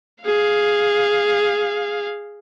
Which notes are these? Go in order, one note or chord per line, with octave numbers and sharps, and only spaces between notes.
G#4 F5